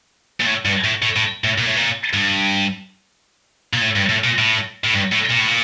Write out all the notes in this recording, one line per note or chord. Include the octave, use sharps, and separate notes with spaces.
A#2
A2
G2
A2
A2
A2
A2
A#2
A2
A#2
G2
A#2
A2
G2
A2
A#2
A2
A2
G2
A2
A#2
A2
A#2